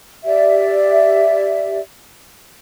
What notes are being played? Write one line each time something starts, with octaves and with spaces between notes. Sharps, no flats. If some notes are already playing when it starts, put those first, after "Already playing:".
G4 D5 E5